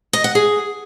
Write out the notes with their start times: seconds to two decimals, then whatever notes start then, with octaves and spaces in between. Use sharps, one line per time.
0.13 D#5
0.24 F#5
0.35 G#4